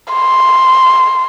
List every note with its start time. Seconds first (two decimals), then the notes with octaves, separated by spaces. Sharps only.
0.13 C6